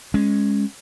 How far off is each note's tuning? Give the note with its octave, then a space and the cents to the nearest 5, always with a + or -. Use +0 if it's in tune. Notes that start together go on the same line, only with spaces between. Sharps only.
G#3 +0 C#4 +0